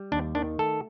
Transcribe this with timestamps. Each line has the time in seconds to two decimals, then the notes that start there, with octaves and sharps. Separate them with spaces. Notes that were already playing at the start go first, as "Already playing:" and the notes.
Already playing: G3
0.12 D#2 D4
0.35 D#3 D4
0.59 A3 A4